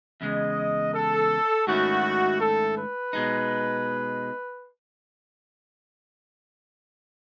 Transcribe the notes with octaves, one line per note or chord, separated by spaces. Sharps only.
E2 C#3 G#3 D#5
A4
G#2 D#3 A3 C#4 E4 F#4
A4
B4
B2 G#3 D#4